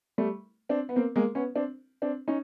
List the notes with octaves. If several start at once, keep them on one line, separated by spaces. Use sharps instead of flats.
G3 A3
C4 D4
B3
A#3 C4
G#3 A#3
B3 C#4
C4 D4
C4 D4
C#4 D#4